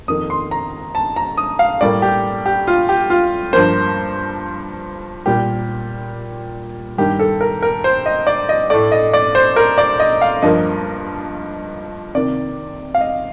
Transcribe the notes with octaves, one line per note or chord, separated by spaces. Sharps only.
F2 D#3 A#3 D#6
C6
A#5
A5
A#5
D#6
F5
A2 G3 A#3 D5
G4
G4
F4
G4
F4
G2 F3 A#3 C5
A#2 G3 A#3 G4
G2 D#3 G3 A#3 G4
A4
A#4
A#4
C5
D#5
D5
D#5
A2 A3 D5
D#5
D5
C5
A#4
D5
D#5
F5
G2 F3 A#3 D#5
C3 D#3 A#3 D5
F5
D#5